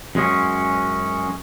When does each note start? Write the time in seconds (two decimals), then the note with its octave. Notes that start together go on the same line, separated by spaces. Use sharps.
0.15 F#2 G#3 C#4